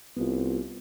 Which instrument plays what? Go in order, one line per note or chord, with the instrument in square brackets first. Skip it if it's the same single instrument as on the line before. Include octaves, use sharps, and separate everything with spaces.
[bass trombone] C2 [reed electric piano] B3 F4